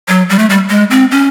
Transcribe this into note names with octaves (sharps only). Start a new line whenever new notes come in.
F#3
G3
A3
G3
G#3
C4
C#4